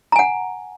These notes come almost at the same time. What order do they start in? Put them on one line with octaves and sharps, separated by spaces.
A#5 G#5 F#5